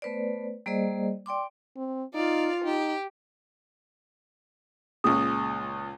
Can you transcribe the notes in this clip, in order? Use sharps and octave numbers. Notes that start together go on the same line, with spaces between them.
A3 B3 B4 C5 D5
G3 A#3 G#4 C5 D5 D#5
D5 G5 C6 D6
C4
D#4 F4 D5 F5
D#4 G4
C#2 A#2 C#3 D#6